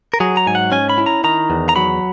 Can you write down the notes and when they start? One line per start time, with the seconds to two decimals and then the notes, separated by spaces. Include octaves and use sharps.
0.14 A#4
0.20 F#3 G#4
0.37 A#5
0.47 G#2 G#5
0.55 F#5
0.72 C#4 G#5
0.90 B5
0.98 E4
1.06 A#5
1.24 D#3 A#5
1.50 E2
1.69 A#5
1.76 F#3 B5